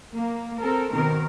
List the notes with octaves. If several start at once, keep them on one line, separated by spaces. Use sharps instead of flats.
A#3
C4 A4 A#4
B2 D#3 C4 A#4